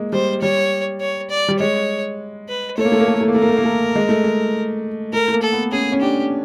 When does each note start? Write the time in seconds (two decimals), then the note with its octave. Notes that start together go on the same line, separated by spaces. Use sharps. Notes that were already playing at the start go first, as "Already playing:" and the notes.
Already playing: G#3 A#3
0.12 G3 C5
0.42 G3 C#5
1.01 C#5
1.30 D5
1.48 G3
1.59 G#3 C#5
2.49 B4
2.77 A3 C#5
2.85 A#3
2.92 A3
3.00 A#3
3.06 A3
3.14 A#3
3.21 A3
3.28 A#3
3.34 A3 A#4
3.42 A#3
3.49 A3
3.57 A#3
3.64 A3
3.95 G#3
4.09 A3
4.24 G#3
5.13 A3 A#4
5.28 A3
5.33 A#3
5.42 A4
5.52 B3
5.72 C#4 G#4
5.92 C#4
6.01 D4 G4